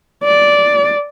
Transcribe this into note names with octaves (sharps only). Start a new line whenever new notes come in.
D5